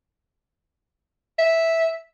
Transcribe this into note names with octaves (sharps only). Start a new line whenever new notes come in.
E5